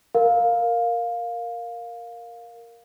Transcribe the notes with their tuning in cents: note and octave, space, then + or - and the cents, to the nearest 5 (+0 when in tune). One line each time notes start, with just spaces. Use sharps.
A#4 +0 F5 +10